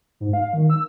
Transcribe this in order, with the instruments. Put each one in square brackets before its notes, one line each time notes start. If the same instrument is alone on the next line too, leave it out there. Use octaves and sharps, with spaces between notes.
[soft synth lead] G#2
F5
D#3
E6